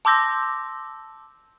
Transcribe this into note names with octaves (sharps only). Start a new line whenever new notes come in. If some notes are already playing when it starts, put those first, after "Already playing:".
A5 C6 D6 E6 G6 A#6